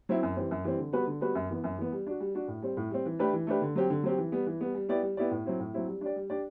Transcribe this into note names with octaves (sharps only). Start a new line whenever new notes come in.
F#3 C4 E4
F#2
E3 G3 C4
F#2
E3 G3 C4
D3
G3 B3 F#4 B4
D3
G3 B3 F#4 B4
F#2
E3 B3
F#2
E3 B3
G3
D4 F#4
G3
D4 F#4
A2
G3 C4
A2
G3 C4
E3
A3 D4 G4 B4
E3
A3 D4 G4 B4
D3
F#3 C4 G4
D3
F#3 C4 G4
E3
G3 B3
E3
G3 B3
G3
B3 E4 G4 D5
G3
B3 E4 G4 D5
A2
F#3 C4 E4
A2
F#3 C4 E4
G3
D4 G4 D5
G3
D4 G4 D5